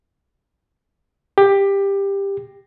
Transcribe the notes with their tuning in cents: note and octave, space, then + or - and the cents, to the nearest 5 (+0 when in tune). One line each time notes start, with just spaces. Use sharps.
G4 +15